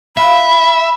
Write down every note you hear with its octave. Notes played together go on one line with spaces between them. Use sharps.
F4 E5 B5